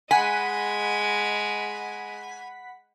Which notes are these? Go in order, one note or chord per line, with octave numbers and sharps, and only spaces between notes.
G#3 D#5 F#5 G#5 B5 B6